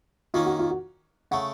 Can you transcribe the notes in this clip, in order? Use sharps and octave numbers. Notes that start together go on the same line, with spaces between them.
D#3 A#3 C#4 F4
F#4
F4
F#4
C#3 A3 F#5